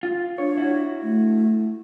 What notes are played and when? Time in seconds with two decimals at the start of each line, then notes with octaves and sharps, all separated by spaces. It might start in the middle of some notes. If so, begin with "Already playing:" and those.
0.03 F4
0.38 D4 C#5
0.58 E4 F#4
1.03 A3